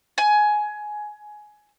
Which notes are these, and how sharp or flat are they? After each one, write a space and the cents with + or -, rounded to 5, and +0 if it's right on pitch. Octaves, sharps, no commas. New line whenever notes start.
G#5 +15